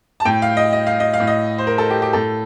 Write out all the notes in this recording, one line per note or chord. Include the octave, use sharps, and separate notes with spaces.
A5
A2 G5
F5
D#5
D#5
F5
D#5
F5
A2
D#5
C5
A#4
A4
G4
G4
A2 A4